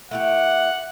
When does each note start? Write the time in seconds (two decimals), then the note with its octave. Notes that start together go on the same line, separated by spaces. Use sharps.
0.11 A3 E4 G4 F#5